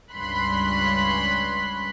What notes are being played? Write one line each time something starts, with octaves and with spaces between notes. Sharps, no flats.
C#2 G2 C#4 B5 C6 F#6